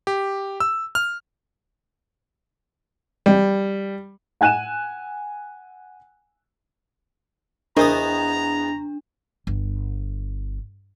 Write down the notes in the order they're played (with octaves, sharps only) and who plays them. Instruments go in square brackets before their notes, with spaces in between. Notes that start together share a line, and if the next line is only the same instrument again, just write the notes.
[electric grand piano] G4
E6
F6
[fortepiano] G3
[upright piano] F#5 G#5 F#6 D#7 E7
[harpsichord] E2 B3 D#6 [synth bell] D4 [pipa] A#4 C5 D#5 [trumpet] A#5
[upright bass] G1